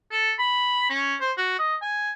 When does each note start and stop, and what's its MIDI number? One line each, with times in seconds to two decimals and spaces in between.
0.11 0.33 69
0.39 0.86 83
0.90 1.15 61
1.21 1.32 72
1.38 1.59 66
1.59 1.76 75
1.82 2.12 80